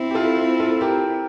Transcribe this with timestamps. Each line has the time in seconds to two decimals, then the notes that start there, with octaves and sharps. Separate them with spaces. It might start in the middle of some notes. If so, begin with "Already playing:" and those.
Already playing: C4 E4
0.10 G4
0.14 F4 A4
0.60 F4 A4
0.81 G4 A#4